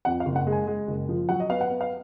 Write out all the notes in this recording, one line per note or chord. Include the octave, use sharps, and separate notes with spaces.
F2 F#5
F5
F#1
F#5
G#3
G#5
G#3
F#1
F3
F#3 F#5
D#5
B3 F5
F#5
B3
F5